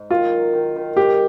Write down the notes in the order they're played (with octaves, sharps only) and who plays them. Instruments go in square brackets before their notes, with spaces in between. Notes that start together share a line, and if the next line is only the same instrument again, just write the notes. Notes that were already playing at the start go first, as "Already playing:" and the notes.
Already playing: [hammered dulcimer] G#2 D#4
[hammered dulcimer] D#3 [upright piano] F4
[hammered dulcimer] F#3
D#3
D#3
[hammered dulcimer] G#2 [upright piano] G4